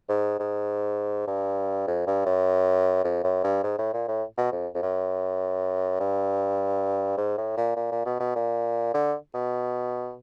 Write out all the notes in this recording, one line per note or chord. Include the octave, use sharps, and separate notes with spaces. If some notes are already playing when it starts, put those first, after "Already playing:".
G#2
G#2
G2
F2
G2
F#2
F2
F#2
G2
G#2
A2
A#2
A2
B2
F2
F2
F#2
G2
G#2
A2
A#2
A#2
A#2
B2
B2
A#2
D3
B2